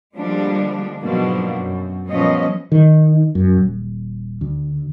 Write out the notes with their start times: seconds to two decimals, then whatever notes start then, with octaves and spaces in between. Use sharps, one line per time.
0.16 D3 F3 G3 G#3 A#3 D4
1.01 G#2 B2 F3 F#3 A#3 D4
1.55 F#2
2.08 A#2 F3 G3 B3 C#4 D#5
2.72 D#3
3.35 F#2
3.57 D#1
4.41 D2